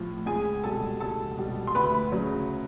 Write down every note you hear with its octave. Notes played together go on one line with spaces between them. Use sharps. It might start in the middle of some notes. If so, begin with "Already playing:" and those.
Already playing: A2 F3
C#2 G#4 G#5
B2 G3 A4 A5
C#2 A4 A5
B2 G3
C6
D2 B4 B5
C#3 F#3